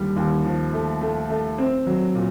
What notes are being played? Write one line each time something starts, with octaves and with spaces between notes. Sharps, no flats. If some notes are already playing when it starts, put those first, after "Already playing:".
Already playing: D#2 D3 G3
D#2
F3
A3
A3
A3
C4
F#3
A#2